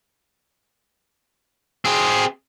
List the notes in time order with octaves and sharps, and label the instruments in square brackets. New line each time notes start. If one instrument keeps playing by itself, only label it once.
[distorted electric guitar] C4 G#4